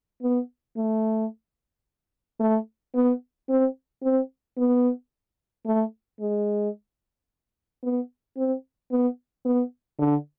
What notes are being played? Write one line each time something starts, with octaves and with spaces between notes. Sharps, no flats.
B3
A3
A3
B3
C4
C4
B3
A3
G#3
B3
C4
B3
B3
D3